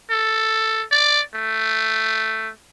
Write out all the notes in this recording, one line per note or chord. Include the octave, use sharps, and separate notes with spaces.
A4
D5
A3